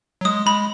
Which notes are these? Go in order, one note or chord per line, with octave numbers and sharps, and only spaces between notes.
F#3
G#3 D#6
G#3 B5